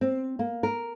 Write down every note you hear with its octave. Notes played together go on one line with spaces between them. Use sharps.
C4
A#3
A#4